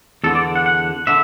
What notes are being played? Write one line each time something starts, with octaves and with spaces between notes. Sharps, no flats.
E2 D3 A4
D5
F#5
F#5
D3 E5